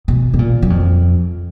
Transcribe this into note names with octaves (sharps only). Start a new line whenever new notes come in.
B2
B2
A#2
F#2
F2